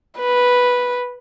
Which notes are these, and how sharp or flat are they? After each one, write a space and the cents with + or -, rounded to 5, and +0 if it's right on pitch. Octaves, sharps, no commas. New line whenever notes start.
B4 -5